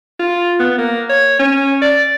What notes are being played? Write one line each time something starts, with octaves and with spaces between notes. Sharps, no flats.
F4
B3
A#3
C#5
C#4
D5